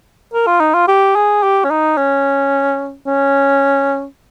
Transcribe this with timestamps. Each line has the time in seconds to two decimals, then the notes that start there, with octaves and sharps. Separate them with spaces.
0.34 A#4
0.47 F4
0.60 D#4
0.74 F4
0.88 G4
1.16 G#4
1.43 G4
1.64 C#4
1.70 D#4
1.97 C#4
3.07 C#4